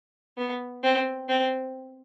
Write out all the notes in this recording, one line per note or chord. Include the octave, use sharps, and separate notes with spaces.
B3
C4
C4